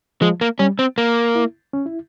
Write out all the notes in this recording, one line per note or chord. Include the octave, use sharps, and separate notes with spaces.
F3 G#3
A#3
G3 C#4
C4
A#3
E4
C#4
E4